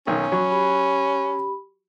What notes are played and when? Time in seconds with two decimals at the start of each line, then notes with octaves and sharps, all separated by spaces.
0.07 B1 D#3 C#4
0.32 F#3 B5 C#6
0.51 G4 B5